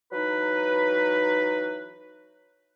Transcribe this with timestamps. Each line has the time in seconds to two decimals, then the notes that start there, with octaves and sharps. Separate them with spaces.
0.12 E3 F#3 D#4 B4